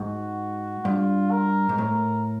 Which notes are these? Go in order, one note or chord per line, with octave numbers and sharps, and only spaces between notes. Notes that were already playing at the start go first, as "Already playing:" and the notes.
Already playing: G#2 F#4
G2 F4
A#4
G#2
A2 A#4